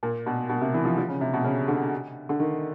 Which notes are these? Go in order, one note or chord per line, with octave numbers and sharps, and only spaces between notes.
A#2
B2
B2
C3
E3
F3
F3
C#3
C3
B2
C#3
D3
D3
D#3